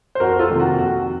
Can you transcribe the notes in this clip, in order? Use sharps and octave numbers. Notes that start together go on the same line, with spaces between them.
C5
F2 F#4 A#4
F4 A4
C3 D#3 A#3
F#4
F2 F#4